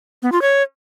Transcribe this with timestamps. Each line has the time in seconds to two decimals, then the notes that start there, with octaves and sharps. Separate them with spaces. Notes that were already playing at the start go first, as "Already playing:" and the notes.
0.23 B3
0.32 F4
0.42 C#5